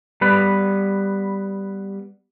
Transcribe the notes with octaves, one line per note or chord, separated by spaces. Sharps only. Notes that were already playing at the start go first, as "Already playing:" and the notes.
G3 B3 B4